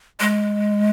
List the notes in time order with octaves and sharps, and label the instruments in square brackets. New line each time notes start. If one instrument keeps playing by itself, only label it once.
[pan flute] G#3